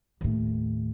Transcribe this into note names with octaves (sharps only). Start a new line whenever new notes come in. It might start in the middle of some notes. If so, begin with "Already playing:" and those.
D#2 A2